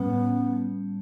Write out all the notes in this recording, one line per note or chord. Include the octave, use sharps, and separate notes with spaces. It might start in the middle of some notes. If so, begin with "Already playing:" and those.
Already playing: A2 G3 B3 C#4